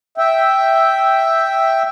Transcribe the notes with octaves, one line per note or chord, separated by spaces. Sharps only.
E5 G5